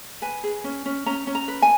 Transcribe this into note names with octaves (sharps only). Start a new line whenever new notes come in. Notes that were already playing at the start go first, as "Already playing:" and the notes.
B4 G#5
G#4
C#4
C#4
C#4 A#5
C#4
A#5
B4
G#5